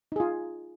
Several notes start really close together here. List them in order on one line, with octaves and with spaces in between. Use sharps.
D#4 G#4 F4